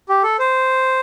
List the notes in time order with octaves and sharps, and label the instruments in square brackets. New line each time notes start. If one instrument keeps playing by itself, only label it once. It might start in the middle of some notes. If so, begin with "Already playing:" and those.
[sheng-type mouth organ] G4
A4
C5